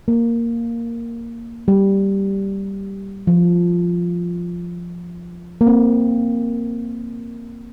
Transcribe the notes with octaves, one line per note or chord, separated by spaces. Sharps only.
A#3
G3
F3
A#3
C4